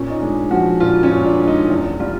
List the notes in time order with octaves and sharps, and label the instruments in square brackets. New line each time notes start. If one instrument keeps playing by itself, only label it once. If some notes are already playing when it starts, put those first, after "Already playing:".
Already playing: [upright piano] A#2 C#4
D#4
G#3 D4
F3 F#4
A#2 F4
C#4
A#2
D4
G#3
D#4
E2
G3 F4